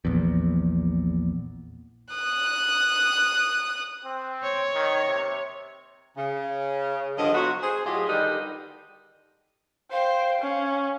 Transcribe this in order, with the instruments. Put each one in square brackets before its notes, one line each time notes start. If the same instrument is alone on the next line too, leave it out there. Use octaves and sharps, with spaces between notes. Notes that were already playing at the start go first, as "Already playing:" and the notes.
[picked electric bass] A#1 E2
[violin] D#6 F#6
[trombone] C4
[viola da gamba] C#5
[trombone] D#3
C3
[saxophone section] C#3
G2 D3 F3 D#5
F#3 B3 F4 F#4
G#4 C5
A2 F#3 F4 G4 G#4 D#5
D3 D#3 G3 D4 D#4 B4
[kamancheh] C5 G5 [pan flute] F5
[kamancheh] C#4